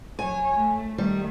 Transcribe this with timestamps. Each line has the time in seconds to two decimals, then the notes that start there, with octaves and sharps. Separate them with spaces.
0.19 F#3 C#5 G#5
0.57 A3
0.98 D#3 G3 A3